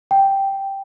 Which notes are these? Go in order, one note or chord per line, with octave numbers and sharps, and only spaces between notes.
G5